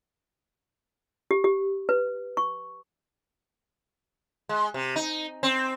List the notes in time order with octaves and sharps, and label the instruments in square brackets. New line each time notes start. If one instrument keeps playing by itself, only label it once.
[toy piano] G4
G4
B4
C#6
[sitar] G#3
C3
D#4
C4